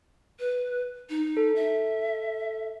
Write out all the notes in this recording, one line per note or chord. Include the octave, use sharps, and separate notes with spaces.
B4
D#4
A4
E5